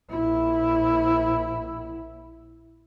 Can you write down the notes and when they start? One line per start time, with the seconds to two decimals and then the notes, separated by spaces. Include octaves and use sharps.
0.10 A#1 E4